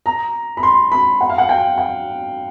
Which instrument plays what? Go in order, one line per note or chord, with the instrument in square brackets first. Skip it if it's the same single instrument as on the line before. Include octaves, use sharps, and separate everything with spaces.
[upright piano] A#5
B5
C6
B5
F#5
F5
F#5
G5
F#5